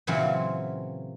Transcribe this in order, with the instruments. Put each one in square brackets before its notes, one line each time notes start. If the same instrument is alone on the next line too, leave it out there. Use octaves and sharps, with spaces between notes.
[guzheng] A#2 C#3 E3 F#3 C4 F4